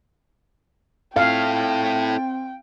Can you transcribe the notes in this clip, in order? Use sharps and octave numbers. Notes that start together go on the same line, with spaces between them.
C4 E4 A4 F5 G5